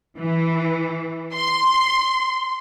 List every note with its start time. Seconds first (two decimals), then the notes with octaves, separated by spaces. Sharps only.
0.18 E3
1.33 C6